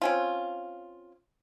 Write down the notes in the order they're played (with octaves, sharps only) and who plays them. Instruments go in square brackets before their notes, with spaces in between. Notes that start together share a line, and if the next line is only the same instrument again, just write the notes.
[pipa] C4 C#4 F4